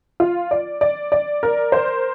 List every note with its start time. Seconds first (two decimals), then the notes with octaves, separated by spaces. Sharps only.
0.20 F4
0.51 D5
0.81 D5
1.12 D5
1.43 A#4
1.72 C5